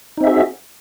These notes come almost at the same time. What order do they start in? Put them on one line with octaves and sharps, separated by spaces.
D#4 C4 E5 G#4 F#4